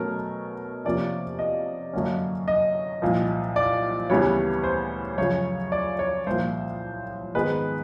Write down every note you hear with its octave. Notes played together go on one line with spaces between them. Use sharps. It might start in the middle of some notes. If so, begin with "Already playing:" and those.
Already playing: B2 F#3 A3 C#4 A#4
C3 F3 A#3 C#4 D5
D#5
F#2 D3 F#3 A#3 C#4
D#5
C2 A#2 F3
D5
D2 C#3 E3 G3 B3 C#5
C5
F#2 C#3 F3 C#5
D5
C#5
C2 A#2 F3 A#3 C5
G#2 D#3 G#3 B3 B4